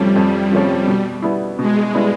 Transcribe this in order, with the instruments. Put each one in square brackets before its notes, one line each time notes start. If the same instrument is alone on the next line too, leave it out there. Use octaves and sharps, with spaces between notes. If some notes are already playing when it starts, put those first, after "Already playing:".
Already playing: [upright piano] F2 C3 F3 A3 C#4 [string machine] G3
[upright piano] F2
C3 F3 A3 C#4
B2
G3 B3 E4
[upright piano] B2 [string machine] G#3
[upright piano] G3 B3 E4